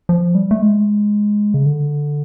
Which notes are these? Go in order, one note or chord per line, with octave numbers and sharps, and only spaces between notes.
F3
G3
A3
G#3
C#3
D3